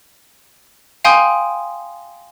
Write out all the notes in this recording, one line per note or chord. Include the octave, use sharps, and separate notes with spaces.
F5 G5 G#5 C6 D#6 G6